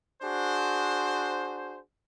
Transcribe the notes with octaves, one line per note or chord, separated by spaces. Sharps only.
D4 F#4 G#4 C5